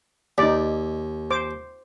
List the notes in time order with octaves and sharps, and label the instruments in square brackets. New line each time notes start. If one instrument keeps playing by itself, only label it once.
[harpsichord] D#2 [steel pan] D#4 D5
[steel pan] C5 D6